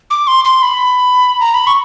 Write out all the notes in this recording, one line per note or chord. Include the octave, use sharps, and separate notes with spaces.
D6
C6
C6
B5
A#5
B5
C#6